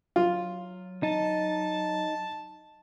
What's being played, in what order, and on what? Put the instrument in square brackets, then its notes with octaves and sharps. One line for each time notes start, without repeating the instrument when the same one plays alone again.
[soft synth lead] F#3 [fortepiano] F4
[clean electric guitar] D#4 [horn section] A5